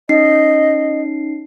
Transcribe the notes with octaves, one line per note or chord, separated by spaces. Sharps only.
C#4 D#4 D#5 C7